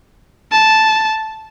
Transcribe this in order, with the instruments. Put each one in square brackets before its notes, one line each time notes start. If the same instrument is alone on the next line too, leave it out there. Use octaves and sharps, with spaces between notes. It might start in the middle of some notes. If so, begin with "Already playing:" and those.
[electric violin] A5